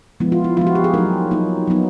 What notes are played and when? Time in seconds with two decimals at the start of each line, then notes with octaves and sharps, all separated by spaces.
0.20 F3 G#3 B3 E4
0.32 F4
0.44 E4
0.57 F3 G#3 B3 E4 F4
0.67 F#4
0.75 G4
0.84 G#4
0.94 F#3 A#3 D#4 A#4
1.31 F#3 A#3 D#4
1.67 F#3 B3 D#4